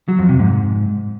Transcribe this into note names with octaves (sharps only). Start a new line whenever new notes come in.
F#3
F2
C3
G#2